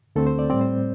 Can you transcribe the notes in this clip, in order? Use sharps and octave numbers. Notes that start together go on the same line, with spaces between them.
D2 D3 A3 C4 A4
C5
D5
A2 G3 C4 D5
C5